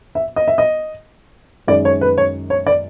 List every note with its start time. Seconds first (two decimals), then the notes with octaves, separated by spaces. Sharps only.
0.15 E5
0.36 D#5
0.48 E5
0.58 D#5
1.68 F#2 D#3 G#3 D5
1.85 C#5
2.01 B4
2.18 C#5
2.50 C#5
2.67 D5